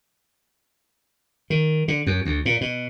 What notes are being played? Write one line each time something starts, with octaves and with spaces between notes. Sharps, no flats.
D#3
D3
F#2
D2
A#2
B2